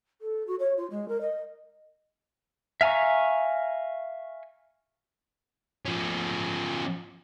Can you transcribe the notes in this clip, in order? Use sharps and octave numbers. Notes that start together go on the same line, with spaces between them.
A4
F#4
C#5
F4
G#3
A#4
D#5
E5 F5 G#5 A#5 C#6
F3 C#4